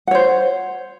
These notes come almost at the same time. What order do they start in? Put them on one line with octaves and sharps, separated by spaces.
F#5 C#5 C5